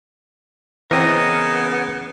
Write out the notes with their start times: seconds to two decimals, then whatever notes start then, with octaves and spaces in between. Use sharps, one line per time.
0.91 C#3 E3 B3 C4 A#4 D#5 A#5